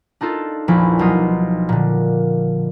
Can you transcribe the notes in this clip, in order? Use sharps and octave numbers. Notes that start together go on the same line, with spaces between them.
D4 D#4 F4 A4
A#1 E2 F3 E4 D6
B1 F4 D#6
A#2 D3